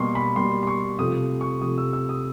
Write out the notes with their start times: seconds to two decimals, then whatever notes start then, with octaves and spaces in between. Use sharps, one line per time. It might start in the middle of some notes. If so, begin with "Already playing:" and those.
Already playing: B2 G3 A#3 C6 C#6
0.15 B5
0.36 B2 G3 A#3 C6
0.63 C6
0.67 C#6
0.99 C3 F3 A3 D#6
1.41 C#6
1.61 C3 F3 A3 D#6
1.78 E6
1.93 E6
2.09 D#6